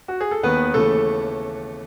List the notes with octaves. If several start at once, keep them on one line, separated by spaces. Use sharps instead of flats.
F#4
G#4
A4
D#2 D#3 B3 B4
D#2 C#3 E3 A3 A4